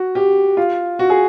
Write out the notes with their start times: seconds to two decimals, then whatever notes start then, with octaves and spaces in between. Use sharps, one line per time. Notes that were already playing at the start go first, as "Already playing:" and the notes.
Already playing: F#4
0.15 G4
0.57 F4
0.99 F#4
1.10 G#4